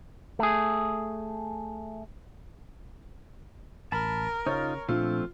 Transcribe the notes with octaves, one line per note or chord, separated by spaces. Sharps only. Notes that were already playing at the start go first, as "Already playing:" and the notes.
A3 G#4
A1 A#4 A5 B5
C#3 D#4 F4 C#5
A#2 F3 A3 C4 D4 F4